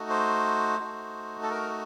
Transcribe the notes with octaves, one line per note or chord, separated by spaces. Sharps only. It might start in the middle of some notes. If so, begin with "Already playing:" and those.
Already playing: A3 D#4 F#4
C5
A3 D#4 F#4
A4
A#4